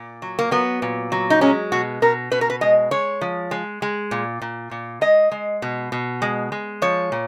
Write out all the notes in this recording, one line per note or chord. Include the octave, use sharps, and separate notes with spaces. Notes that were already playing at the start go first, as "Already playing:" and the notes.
Already playing: A#2
F#3
A#3
F#3 B3
A#2
F#3
D#4
G#3 C#4
B2 F#4
B2 A#4
B2 B4
A#4
B4
G#3 D#5
G#3 C#5
F3
G#3
G#3
A#2
A#2
A#2
G#3 D#5
G#3
B2
B2
G#3
G#3
F3 C#5
A#2